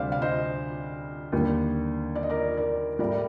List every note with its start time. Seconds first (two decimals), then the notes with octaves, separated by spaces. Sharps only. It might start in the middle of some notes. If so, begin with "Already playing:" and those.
Already playing: D2 C3 G3 C5 D5 F5
0.12 F5
0.22 C5 D#5
1.32 D#2 D3 G3
2.15 D5
2.23 D#5
2.30 A#4 D5
2.57 A#4 D5
2.99 A2 G3 A#4 D5